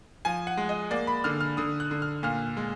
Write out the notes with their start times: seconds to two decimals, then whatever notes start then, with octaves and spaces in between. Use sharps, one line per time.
0.25 F3 G#5
0.47 F#5
0.57 G#3
0.69 D#5
0.91 A#3 D5
1.07 B5
1.24 D3 F6
1.41 F6
1.57 D3 D#6
1.80 F#6
1.91 D3
2.02 F6
2.23 A#2 F6
2.57 G#3